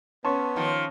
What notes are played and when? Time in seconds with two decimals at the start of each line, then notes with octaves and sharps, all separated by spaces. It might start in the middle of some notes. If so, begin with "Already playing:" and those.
0.25 B3 C#4 A5 C6 C#6
0.56 D#3 F3